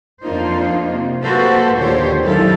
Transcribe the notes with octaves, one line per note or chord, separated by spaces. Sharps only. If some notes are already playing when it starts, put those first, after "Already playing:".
F2 A#3 D4 D#4 F4 C5
C3
A#3 F#4 G4 A4 B4 C5
D#2 A#2 D3 G4 C5 C#5
F#2 D#3 G#3 E4 A4 F5